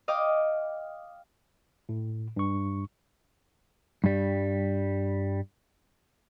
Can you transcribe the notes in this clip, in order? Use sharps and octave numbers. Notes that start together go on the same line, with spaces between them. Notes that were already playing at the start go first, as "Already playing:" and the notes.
D#5 F5 G5 D6 D#6
A2
G2 C#6
G2 G3